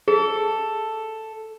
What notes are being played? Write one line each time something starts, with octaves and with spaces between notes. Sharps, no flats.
G#4 A4